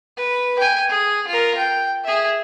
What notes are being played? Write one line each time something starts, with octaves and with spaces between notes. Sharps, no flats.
B4
G5 G#5
G#4
F4 A#4
G5
G#4 E5